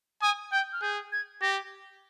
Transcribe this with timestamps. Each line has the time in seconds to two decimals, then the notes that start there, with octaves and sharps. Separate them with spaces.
0.22 G#5 D#6
0.52 G5 G6
0.73 F6
0.82 G#4 G6
1.12 G#6
1.41 G4 A#6